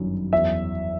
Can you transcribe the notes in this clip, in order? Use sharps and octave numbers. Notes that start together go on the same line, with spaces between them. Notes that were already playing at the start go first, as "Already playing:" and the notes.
Already playing: G1 F#2 D#3
E2 E5